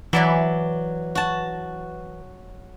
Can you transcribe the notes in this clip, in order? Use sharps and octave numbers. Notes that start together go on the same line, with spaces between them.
E3 F#3 D5 E5
F#4 A5